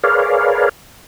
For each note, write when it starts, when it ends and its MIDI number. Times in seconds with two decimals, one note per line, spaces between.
0.04 0.69 68
0.04 0.69 70
0.04 0.69 71
0.04 0.69 73
0.04 0.69 74
0.04 0.69 77